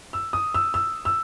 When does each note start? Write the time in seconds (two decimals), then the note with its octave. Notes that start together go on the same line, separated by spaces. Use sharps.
0.13 E6
0.33 D#6
0.54 E6
0.74 E6
1.05 E6